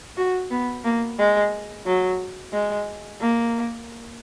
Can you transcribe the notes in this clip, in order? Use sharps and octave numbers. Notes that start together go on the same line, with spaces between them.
F#4
B3
A#3
G#3
F#3
G#3
A#3